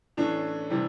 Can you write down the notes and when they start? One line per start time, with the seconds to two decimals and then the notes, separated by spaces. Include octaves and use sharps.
0.17 A2 E3 A3 C#4 D4
0.70 C3 E3 G3